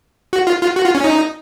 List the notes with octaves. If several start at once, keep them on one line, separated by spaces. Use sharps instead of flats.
F#4
F4
F4
F#4
F4
C#4
D#4